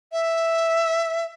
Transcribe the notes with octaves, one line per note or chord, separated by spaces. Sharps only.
E5